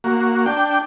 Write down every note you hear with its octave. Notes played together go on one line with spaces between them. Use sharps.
A#3 F#4
D4 G5